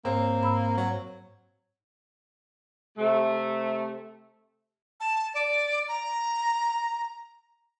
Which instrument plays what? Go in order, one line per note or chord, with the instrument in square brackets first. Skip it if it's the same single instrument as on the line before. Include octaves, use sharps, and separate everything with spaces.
[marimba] G#2 C#5 [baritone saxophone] A#3 [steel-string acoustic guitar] C4
[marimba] G#2 B5 E6
[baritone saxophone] F#3
[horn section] C3 A3
[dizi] A5
D5
A#5